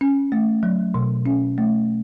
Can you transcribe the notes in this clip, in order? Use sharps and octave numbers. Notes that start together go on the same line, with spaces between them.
C#4
A3
F#3
B2
C#4
A3